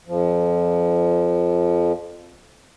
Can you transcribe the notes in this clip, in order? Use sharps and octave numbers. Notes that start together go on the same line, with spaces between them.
F2 F3